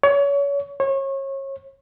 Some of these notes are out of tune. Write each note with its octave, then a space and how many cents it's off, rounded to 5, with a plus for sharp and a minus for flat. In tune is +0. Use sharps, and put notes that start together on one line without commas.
C#5 +30
C#5 -30